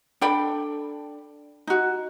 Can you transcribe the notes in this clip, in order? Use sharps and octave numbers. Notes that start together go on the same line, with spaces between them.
D4 A4 G5 B5
D#4 F#4